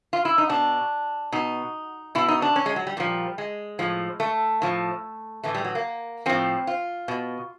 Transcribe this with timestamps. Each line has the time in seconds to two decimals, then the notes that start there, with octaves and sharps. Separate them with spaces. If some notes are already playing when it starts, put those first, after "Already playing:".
0.13 F4
0.25 E4
0.38 D#4
0.49 B2 D4
1.32 B2 D#4
2.15 B2 E4
2.28 D#4
2.42 D4
2.56 C#4
2.66 G#3
2.76 F#3
2.87 G3
2.97 A#2 F3 G3
3.38 G#3
3.79 A2 F3
4.20 A3
4.62 A2 F3
5.44 A2 E3 A3
5.55 G3
5.65 F#3
5.75 A#3
6.26 A2 F3 C4
6.67 F4
7.08 B2